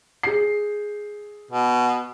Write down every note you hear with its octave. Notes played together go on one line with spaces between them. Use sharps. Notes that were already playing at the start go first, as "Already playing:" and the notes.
G#4 C7
B2